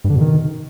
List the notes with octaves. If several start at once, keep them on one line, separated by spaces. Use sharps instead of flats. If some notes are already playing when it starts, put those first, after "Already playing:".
G2
D3
B2
D#3